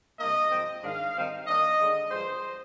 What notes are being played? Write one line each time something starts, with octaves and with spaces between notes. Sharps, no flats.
C3 G3 A#3 D4 D#5
G#2 F3 C4 D#4
G#2 D#3 G#3 D4 F5
D#3 G3 C4 D#4
D#3 A#3 D4 D#5
D3 G#3 D4
G2 F3 G#3 C5